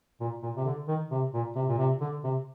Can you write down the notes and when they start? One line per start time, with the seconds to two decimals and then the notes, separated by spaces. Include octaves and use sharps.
0.20 A#2
0.43 A#2
0.57 C3
0.66 D3
0.88 D#3
1.11 C3
1.34 A#2
1.56 C3
1.68 A#2
1.78 C3
2.01 D3
2.24 C3